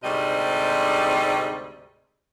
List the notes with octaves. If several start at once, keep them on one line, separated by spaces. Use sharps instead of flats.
D2 G#2 C3 G3 D#5